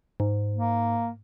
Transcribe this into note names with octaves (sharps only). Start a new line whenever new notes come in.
G#2
A#3